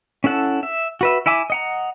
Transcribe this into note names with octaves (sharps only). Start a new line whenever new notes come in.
C#4 E4 A4 F#5 A5
E5
F#4 B4 E5
E4 E5 G#5 D6
D#5 F#5 A#5